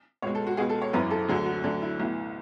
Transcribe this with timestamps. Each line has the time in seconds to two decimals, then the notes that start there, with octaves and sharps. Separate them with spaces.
0.22 C#2 B2 G#3 C#5
0.35 A4
0.47 F#4
0.57 C#2 B2 G#3 G#4
0.70 A4
0.82 C#5
0.93 G#1 F#2 E3 B4
1.11 A4
1.28 D2 D3 F#3 G#4
1.46 F#4
1.64 D2 D3 F#3 D4
1.82 E4
2.00 B1 A2 E3